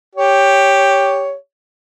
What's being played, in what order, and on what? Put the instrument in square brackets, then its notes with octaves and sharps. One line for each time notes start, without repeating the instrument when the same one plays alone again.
[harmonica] G4 C#5